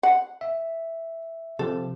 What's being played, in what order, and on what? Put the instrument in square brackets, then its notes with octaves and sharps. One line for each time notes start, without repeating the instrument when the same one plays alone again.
[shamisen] F#5
[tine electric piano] E5
[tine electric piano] C3 F3 [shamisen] A4